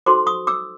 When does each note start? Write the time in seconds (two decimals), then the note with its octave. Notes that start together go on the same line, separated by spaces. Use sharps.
0.06 D#4 F#4 A4 C5 C6 D6
0.27 C#6 D#6
0.47 D6 E6